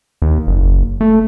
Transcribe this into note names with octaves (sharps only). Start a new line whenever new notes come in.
D#2
F#1
A3